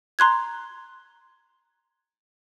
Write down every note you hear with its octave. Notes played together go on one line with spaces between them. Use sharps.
A#5 C6 F#6 G#6